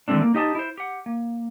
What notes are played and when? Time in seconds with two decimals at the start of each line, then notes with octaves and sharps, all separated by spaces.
0.08 D#3 E3 G#3 A3 C4 D4
0.22 A#3
0.35 D#4 G4 D#5 G#5 A5
0.55 E4 C5
0.77 G4 F#5
1.06 A#3